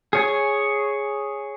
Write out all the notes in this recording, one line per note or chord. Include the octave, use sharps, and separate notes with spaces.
G#4 C#5 G#5